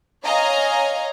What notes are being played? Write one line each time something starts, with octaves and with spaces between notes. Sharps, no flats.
C#5 D#5 F5 G#5 A#5